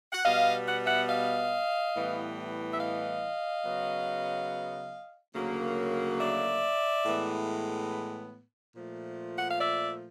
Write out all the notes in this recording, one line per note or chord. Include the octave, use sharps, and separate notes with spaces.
F#5
B2 G3 B3 D#5 F5
F#5
E5 F#5
D#5 F5
A2 E3 G3 B3
E5
D#5 F5
C#3 F#3 B3
D2 C#3 F#3 A#3
D5 E5
A2 E3 G#3 B3
A#2 F3 A3
F#5
F5
D5 E5